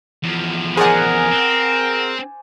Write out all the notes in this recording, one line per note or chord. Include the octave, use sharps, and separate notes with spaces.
E2 F3
G#4 A#4 C5 D5 F#5 G#5
C4